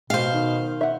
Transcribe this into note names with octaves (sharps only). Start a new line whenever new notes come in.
B2 C5 F5
D#3
E5 F#5